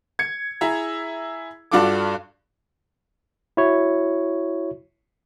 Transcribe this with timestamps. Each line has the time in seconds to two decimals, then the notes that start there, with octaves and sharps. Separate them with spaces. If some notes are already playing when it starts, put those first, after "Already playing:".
0.19 G#6 C#7
0.61 E4 G#4 E5 A#5
1.72 G2 D4 F4 F#4 A4 D6
3.57 E4 F#4 C#5